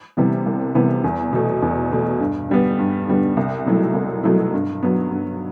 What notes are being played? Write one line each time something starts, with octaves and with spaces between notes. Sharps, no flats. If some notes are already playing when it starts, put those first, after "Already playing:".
C3 E3 G3 B3
C2
C3 E3 G3 B3
E2
B2 A3
E2
B2 A3
G2
D3 G3 B3
G2
D3 G3 B3
C2
B2 F#3 A3 E4
C2
B2 F#3 A3 E4
G2
F#3 B3
G2